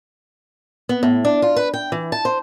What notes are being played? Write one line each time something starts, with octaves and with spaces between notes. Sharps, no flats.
B3
A2
D4
F4
B4
G5
E3
A5
C5